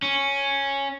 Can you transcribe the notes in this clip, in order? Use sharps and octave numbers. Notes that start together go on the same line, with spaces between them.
C#4